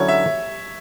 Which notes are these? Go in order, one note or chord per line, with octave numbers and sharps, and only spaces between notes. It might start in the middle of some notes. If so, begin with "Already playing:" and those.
Already playing: D3 F#3 C#4 E4 C#5
E5